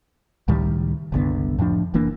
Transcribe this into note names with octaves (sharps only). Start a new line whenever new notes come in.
C#2 A2 D#3 G3
F#1 C2 D3 B3
F2 A2 F3 D4
F1 E3 A#3 D4